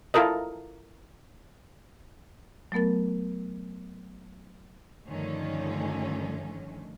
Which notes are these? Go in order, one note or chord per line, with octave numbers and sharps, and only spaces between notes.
E4 F4 A4 A#4 D#5
F#3 A3 B3 A#4 A6
G2 D3 D#3 F3 A3 C#4